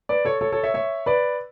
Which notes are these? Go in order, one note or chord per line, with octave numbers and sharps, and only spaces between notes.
B4 D5
A4 C#5
A4 C#5
A4 C#5
C#5 E5
C#5 E5
B4 D5